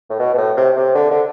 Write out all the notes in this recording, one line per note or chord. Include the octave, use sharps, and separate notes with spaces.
A2
B2
B2
A2
C3
C3
D3
D3